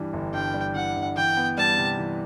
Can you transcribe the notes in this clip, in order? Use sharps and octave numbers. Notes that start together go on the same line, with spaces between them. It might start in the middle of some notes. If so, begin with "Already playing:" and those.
Already playing: G2 E3 G3
G1
G2 G5
G3
E3 F#5
G1
E3 G5
B3
G3 A5
C3
E3